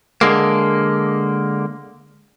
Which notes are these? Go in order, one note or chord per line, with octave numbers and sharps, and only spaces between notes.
D3 G#3 A#3